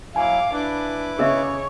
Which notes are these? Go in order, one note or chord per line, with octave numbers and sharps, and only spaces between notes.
F#3 E4 F5 G#5 D6
D4 E4 B4 D6
C#3 G#4 C#5 D#5 E5 E6